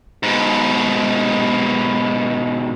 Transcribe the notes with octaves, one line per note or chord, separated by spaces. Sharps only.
G#2 B2